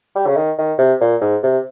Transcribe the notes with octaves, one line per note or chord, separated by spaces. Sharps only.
G3
C#3
D#3
D#3
C3
A#2
G#2
C3